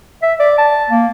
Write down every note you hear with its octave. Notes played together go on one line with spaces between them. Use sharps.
E5
D5
A5
A#3